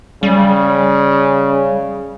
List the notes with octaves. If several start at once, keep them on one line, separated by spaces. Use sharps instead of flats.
C#3 G3